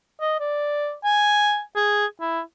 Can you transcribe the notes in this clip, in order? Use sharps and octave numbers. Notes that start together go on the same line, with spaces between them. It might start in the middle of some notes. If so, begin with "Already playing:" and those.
D#5
D5
G#5
G#4
E4